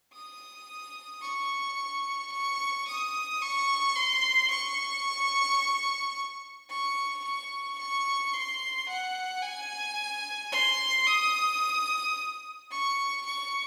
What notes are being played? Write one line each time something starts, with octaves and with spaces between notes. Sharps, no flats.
D#6
C#6
C#6
D#6
C#6
C6
C#6
C#6
C#6
C#6
C6
F#5
G#5
C6
D#6
C#6
C#6